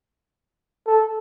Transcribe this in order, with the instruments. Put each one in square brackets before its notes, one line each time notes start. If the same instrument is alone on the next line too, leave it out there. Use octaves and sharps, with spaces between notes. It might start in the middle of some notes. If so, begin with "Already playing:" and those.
[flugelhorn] A4